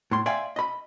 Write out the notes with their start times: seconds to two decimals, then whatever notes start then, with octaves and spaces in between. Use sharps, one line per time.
0.11 A2 C6
0.26 D5 E5 F5 G5 G#5 C6
0.56 D#5 B5